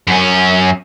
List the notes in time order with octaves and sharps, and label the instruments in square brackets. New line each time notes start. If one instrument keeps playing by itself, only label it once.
[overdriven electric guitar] F#2 C#4